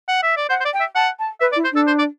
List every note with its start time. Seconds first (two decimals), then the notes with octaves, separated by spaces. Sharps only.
0.08 F#5
0.23 E5
0.37 D5
0.49 C5 F#5
0.60 C5
0.65 D5
0.73 G5
0.80 E5
0.95 F#5 A5
1.19 A5
1.41 B4 E5
1.52 D5
1.56 E4
1.64 C5
1.72 D4 A4
1.87 C5
1.99 D5